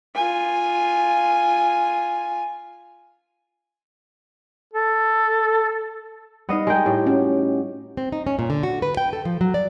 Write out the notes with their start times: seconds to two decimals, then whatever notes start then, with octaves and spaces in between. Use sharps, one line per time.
0.15 F4 G#5
4.74 A4
6.49 G3 B3 D#4 D#5 F5
6.67 G#3 A#4 G5
6.86 A2 G4
7.06 C#4 F#4
7.97 C4
8.12 D#4
8.27 C#4
8.39 A#2
8.50 D3
8.63 F#4
8.82 B4
8.97 G5
9.13 A4
9.25 F3
9.41 F#3
9.54 D5